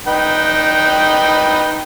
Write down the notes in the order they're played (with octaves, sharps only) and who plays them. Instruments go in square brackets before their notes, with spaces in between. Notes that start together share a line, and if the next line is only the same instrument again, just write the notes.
[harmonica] D#4 B4 G5